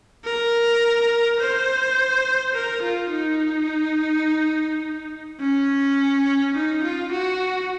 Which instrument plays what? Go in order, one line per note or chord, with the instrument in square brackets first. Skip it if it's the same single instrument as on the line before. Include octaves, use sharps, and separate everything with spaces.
[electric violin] A#4
C5
A#4
F4
D#4
C#4
D#4
F4
F#4